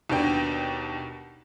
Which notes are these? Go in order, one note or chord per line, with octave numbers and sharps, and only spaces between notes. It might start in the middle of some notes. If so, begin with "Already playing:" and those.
D#2 B2 D4 G5